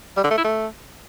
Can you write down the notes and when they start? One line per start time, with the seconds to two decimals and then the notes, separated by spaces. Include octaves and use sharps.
0.17 G3
0.24 D3
0.31 A3
0.38 E4
0.44 A3